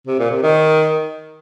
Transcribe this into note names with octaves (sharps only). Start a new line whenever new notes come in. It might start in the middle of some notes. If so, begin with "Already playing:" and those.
C3
A#2
C3
D#3